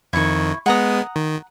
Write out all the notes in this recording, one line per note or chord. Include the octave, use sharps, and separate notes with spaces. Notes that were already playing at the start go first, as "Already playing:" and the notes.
F2 D#3 E4 C#6
G#3 B3 F#5 A#5 D#6
D#3